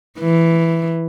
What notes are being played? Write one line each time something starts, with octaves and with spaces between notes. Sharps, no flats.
E3